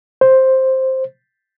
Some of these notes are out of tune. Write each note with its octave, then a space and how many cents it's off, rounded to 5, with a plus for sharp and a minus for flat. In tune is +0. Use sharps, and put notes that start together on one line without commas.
C5 +5